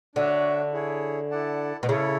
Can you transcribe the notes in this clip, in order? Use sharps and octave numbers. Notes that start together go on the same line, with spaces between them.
D3 D4 F#4 C#5 E5
E4 G#4 C#5
E4 A4 D5 F#5 A5
B2
C#3 E4 A4 C#5